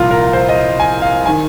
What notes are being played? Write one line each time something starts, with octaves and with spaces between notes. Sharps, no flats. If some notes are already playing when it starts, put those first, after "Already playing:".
Already playing: C2 A#2 F3 F4 A#4
A#4
C5
D#5
G#5
F5
D#3 G#5